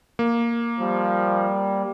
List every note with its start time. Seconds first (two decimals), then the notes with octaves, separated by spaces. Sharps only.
0.19 A#3
0.80 F3 G3